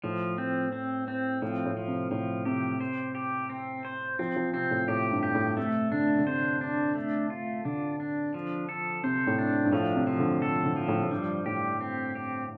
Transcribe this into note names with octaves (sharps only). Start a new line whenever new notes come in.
A2 F3
C4
C4
C4
A2 F3
A2
F3
C3
A2 F3
C3 G4
C5
G4
C4
C5
F3 C4
F3
C3 C4
A2
A2 G4
G2
G4
A2
C3 A3
D3 D4
D3
C3 C5
D4
A3
F4
D3 D4
D4
F3
A4
C3 C5
A2
D4
G2
A2 F3
C3
F3
D3
A4
D3
F3
A2
A2
G2 G3
A2 G4
C4
G4